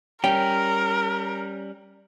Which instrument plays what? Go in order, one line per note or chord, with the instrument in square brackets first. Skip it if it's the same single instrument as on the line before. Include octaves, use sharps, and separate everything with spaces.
[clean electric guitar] G3 C#4 [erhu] A#4 [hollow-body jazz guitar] G5